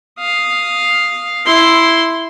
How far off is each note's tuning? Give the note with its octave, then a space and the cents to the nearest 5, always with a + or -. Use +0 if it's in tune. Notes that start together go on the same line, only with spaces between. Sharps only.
F5 +0 D#6 +0
E4 +0 C6 -5